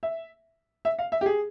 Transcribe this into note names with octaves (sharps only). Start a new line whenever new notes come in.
E5
E5
F5
E5
G4
G#4